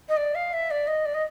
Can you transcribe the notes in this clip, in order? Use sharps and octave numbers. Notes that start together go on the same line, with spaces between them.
D#5
D5
F5
E5
D5
D#5
D5
D#5